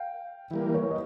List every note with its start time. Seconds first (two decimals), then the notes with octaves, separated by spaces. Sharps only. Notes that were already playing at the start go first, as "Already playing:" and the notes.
Already playing: F5 G5
0.51 E3 G3 A#3
0.74 B4 C#5
0.91 D#5